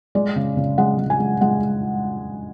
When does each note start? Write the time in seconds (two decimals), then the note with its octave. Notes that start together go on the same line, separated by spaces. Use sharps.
0.15 G#3 D5
0.36 C#3
0.57 C#3
0.78 G#3 F#5
0.98 G#3
1.10 G#5
1.20 G#3
1.41 G#3 F#5